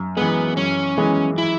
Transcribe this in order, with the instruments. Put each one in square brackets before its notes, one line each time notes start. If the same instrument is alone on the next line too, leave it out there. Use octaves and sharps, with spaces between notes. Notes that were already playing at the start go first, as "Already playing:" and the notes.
Already playing: [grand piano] F#2
[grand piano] E3 G#3 [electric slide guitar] B3
[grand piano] F#2 [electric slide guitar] C#4
[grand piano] E3 G#3
[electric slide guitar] E4